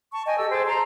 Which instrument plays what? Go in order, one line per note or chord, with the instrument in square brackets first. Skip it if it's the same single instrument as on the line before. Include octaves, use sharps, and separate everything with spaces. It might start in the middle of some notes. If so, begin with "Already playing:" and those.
[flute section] A5 C#6
D#5 G5 G#5
G4 A4 E6
G#4 C5 G5 A5
A5 A#5 C6